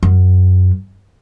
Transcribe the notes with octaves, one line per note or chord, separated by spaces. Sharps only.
F#2